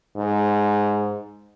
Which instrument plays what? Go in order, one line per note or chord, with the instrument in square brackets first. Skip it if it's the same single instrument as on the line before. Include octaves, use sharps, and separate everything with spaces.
[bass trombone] G#2